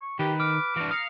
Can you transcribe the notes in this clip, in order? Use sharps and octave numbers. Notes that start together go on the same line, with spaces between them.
C#6
D#3 G4 B4
D6 F6
E3 D4 F#4
A#4 F5 D#6 C#7